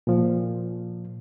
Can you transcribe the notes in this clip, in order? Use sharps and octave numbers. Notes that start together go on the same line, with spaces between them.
A#2 F3